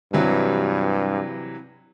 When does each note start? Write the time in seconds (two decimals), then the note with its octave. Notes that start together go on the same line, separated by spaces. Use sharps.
0.13 G2 C3 E3 F#3